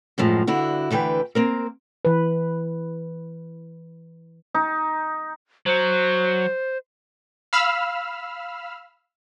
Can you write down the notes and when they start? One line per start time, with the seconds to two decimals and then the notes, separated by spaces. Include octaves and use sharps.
0.18 F#2 A2 F3 G#3
0.47 G2 D3 E4 F#4
0.90 D2 D3 E3 B4 G5
1.35 A#3 C4 A#4
2.05 E3 B4
4.54 D#4
5.66 F#3 C5
7.53 F5 B5 E6 F6